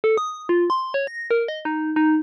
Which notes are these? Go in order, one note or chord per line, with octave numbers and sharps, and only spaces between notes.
A4
D#6
F4
C6
C#5
A#6
A#4
D#5
D#4
D#4